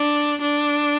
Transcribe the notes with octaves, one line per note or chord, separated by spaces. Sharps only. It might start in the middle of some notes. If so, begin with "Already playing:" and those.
Already playing: D4
D4